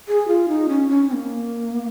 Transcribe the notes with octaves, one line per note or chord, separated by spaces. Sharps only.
G#4
F4
D#4
C#4
C#4
C4
A#3